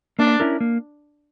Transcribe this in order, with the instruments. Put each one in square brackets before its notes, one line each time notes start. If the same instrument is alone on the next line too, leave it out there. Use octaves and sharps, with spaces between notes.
[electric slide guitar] A#3 [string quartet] D4
[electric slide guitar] C#4 E4 A#4
A#3